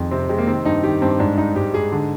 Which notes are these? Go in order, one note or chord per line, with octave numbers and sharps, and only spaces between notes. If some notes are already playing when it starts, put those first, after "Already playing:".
Already playing: F2 D#3 G#4
C3 C4
C3 G#3
A#3
D#3 C4
G2 D#4
D#3 G4
G2 C4
G#2 D4
G#2 D#4
G#2 G4
G#2 G#4
D3